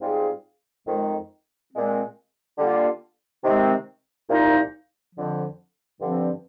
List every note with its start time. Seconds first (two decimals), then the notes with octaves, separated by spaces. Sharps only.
0.01 G#2 G3 C4 F4 G#4
0.87 F2 D#3 G#3
1.73 A#2 G#3 C4
2.58 D3 G3 A#3 F4
3.44 C3 D#3 G#3 C4
4.30 C2 A#2 F3 A#3 D#4
5.15 F2 D3 F3
6.01 G2 D3 F3 C4